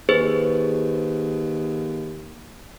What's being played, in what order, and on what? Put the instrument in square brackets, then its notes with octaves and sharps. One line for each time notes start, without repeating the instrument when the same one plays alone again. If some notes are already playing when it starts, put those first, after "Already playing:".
[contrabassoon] D#2 [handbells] G#4 B4 C5